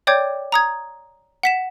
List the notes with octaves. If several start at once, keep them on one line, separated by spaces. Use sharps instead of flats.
C#5 D5 G5 D6 G6 G#6
A#5 D#6 G#6
F#5 B6 E7